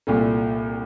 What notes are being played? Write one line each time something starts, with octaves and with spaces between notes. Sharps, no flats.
C2 A#2 A3